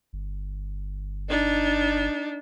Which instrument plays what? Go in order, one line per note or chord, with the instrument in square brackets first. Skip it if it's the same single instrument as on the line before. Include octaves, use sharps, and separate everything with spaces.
[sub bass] G1
[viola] D4 D#4